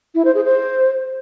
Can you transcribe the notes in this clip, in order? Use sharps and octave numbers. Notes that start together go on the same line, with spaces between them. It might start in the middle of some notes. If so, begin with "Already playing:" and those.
E4
C5
G#4
C5